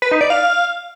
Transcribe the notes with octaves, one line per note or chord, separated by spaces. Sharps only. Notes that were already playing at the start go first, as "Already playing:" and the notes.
B4
D#4
D5
F5